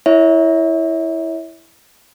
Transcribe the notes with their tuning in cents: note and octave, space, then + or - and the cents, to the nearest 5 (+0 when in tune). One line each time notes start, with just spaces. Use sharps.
E4 +0 C#5 +15 E5 -30